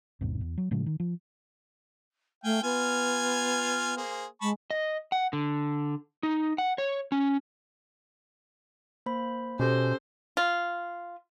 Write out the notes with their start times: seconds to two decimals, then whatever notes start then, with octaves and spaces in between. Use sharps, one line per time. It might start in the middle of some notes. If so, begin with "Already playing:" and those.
0.21 A1 E2 G#2 C3
0.41 E2
0.58 F#3
0.71 A2 C#3 F3 G#3
0.86 D#3
1.00 F3
2.44 A3 F5 G5 G#5
2.63 B3 F4 G#5 F6
3.97 A#3 G#4 C5
4.41 G#3 A5 B5 C#6
4.71 D#5
5.12 F#5
5.33 D3
6.23 D#4
6.58 F#5
6.78 C#5
7.12 C#4
9.06 A#3 C5 B5
9.59 B2 C#4 G4 A4 C5
10.37 F4